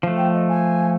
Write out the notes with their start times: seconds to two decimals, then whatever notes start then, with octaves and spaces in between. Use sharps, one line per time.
0.03 F3 A3
0.17 G5
0.34 D#5
0.49 G#5